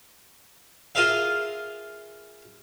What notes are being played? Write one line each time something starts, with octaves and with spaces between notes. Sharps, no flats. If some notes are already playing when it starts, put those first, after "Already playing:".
F4 G#4 A#4 E5 F5